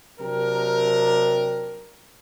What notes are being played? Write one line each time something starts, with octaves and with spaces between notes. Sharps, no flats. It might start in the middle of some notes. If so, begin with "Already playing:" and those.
C3 F#3 D4 G4 A#4